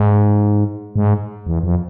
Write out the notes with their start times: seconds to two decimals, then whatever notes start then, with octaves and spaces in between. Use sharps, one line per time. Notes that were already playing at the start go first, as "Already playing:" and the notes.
Already playing: G#2
0.96 G#2
1.47 E2
1.63 F2